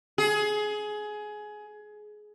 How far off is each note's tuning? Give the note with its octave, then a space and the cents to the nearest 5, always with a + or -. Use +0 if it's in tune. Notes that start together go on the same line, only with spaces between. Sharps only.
G#4 +20